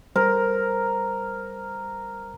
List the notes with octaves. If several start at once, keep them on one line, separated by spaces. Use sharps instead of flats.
G3 A#4 C5